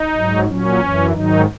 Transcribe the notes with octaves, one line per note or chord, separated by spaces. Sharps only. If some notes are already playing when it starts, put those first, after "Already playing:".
Already playing: D#4
G#2 F#3
A#2 F#3 C#4
F#2 E3
G#2 D#3 F#3 D#4